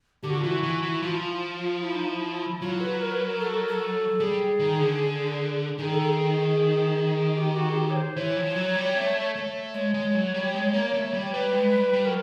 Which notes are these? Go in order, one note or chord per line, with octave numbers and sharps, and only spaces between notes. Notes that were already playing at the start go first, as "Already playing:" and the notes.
D3 G4
F#4
F4
E3 F#4
E3
E3
F3 F4
E4
F4
E4
D#4
E4
F#3 F4
B4
A#4
B4
A#4
A4
A#4
A4
G3 G#4
D#3
D3
D#3 G#4
A4
G#4
G4
F#4
G#4
G4
C#5
C5
E3 C#5
F3
F#3
G3
A3
A3
G#3 C#5
G#3
F#3
G3
G#3
A#3
A3
G3
G3 B4
G#3
G3
G3
F#3 A#4